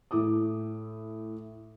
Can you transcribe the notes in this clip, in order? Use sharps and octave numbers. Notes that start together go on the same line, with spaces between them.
A2 E4 D6 D#6